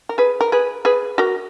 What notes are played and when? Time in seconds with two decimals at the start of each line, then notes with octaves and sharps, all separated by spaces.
0.09 A#4
0.18 G#4 B4
0.41 A#4
0.52 G#4 B4
0.85 G#4 B4
1.18 F#4 A#4